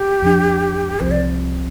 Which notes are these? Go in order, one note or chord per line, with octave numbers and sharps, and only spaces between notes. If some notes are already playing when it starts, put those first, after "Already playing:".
Already playing: G4
F2 F3 D4
C2 C3 F3 C5
D5